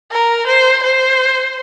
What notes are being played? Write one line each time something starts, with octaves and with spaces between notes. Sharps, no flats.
A#4
C5
C5